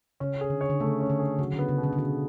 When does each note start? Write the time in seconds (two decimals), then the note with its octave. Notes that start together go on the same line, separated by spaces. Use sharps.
0.20 C#3 C#4
0.41 G#4
0.50 D3
0.61 C#5
0.70 D3
0.80 C#3 A3
1.00 C#4
1.10 D3
1.19 G#4
1.39 C#3 F#3
1.54 D3
1.59 B3
1.69 C#3
1.78 B2
1.83 D3
1.93 C#3
1.98 B2 D3